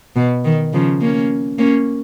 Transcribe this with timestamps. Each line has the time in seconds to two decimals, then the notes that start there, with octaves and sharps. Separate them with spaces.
0.16 B2
0.45 D#3
0.73 C#3 F3
1.01 A#3 C#4
1.58 A#3 C#4